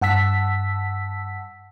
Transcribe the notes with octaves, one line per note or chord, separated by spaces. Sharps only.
G2 F#5 A5 E6 B6